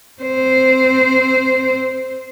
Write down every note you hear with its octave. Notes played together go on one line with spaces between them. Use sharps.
C4 C5